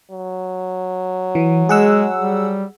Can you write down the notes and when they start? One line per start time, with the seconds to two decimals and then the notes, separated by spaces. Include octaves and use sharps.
0.11 F#3
1.35 E3
1.69 G#3 G#4 F#5 E6
2.20 G3